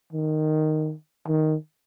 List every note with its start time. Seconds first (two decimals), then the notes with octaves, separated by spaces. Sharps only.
0.13 D#3
1.28 D#3